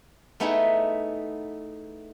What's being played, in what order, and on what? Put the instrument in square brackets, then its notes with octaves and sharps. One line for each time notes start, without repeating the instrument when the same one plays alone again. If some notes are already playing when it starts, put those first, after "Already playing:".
[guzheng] A3 B3 D#4 E4 G#4 B4